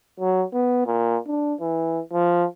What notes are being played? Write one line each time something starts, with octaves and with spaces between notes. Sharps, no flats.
F#3
B3
A#2
D4
E3
F3